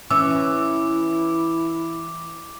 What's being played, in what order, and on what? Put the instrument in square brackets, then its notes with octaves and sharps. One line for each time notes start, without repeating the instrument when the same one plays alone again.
[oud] E3 C#4 [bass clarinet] E4 [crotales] D6 [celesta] E6